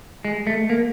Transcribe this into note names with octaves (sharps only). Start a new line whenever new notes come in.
G#3
A3
A#3